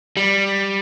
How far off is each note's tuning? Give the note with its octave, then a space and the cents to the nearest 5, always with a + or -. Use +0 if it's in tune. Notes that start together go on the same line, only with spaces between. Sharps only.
G3 +5